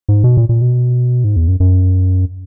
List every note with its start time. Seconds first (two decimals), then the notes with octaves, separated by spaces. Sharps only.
0.09 G#2
0.24 B2
0.37 A#2
0.49 A#2
0.61 B2
1.24 G#2
1.36 E2
1.48 F#2
1.60 F#2